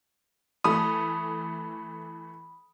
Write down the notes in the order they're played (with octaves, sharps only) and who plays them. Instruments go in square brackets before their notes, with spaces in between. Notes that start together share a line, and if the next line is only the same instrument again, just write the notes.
[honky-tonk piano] E3 A3 A4 [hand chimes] B5 [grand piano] D#6